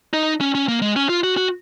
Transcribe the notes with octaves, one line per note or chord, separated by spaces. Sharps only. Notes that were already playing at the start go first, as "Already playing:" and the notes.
D#4
C#4
C#4
A#3
G#3
C#4
F4
F#4
F#4